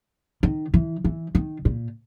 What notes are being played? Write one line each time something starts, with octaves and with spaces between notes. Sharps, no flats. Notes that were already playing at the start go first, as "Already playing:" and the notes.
D#3
E3
E3
D#3
A#2